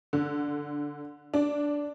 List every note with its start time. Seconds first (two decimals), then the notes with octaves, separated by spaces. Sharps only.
0.13 D3
1.34 D4